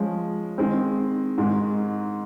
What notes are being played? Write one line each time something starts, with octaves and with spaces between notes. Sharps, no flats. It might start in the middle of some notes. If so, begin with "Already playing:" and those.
Already playing: F3 G#3 C#4
D#3 G#3 C4
G#2 D#3 G#3